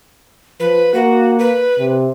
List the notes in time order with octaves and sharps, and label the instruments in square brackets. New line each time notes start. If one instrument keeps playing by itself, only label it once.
[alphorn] F3 [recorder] B4
[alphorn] A#3 [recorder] F#4
[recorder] B4
[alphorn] C3